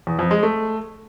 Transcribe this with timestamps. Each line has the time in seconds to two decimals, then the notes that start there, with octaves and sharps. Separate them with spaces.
0.07 E2
0.19 F2
0.31 G#3
0.43 A3